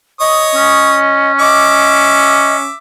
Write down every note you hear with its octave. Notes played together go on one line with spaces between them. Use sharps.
C#5 D#5 D#6
C#4
D#5 E5 D6